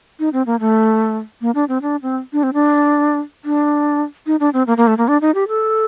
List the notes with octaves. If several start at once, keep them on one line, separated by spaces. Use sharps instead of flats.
D#4
C4
A#3
A3
A#3
D4
C4
D4
C4
D4
C4
D4
D4
D#4
D4
C4
A#3
A#3
A3
A#3
D4
D#4
G4
A4